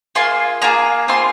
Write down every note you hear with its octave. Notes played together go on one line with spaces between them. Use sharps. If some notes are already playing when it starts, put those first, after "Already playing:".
A#3 F4 G#4 C6
A#3 F4 G#4 A#5
C4 F4 G#4 C6